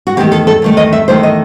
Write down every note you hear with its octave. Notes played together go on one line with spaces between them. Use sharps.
F#4
E2 D#3 A3 G4
A4
A4
E2 D#3 A3
D#5
E5
E2 D#3 A3 C5
D#5